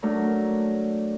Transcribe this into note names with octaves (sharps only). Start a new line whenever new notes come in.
F#3 A3 D4 A#4